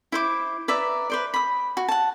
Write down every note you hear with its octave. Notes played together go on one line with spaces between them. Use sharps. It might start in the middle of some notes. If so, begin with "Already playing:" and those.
E4 C5 D6
B4 D5 E5 A#5
B4 C5 D5
B5 D#6
F#4
F#5 A5